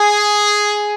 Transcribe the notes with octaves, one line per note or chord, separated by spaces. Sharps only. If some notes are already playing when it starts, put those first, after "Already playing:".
Already playing: G#4